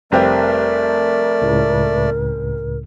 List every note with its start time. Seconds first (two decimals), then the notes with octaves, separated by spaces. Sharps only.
0.12 F1 G3 A3 C4 A#4 D5
1.42 C#2 A2 C#3